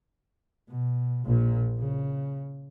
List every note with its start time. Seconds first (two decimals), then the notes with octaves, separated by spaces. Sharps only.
0.69 B2
1.25 A#1 A#2
1.79 C#3